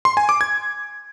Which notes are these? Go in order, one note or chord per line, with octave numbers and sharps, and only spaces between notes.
C6
G#5
D6
G#6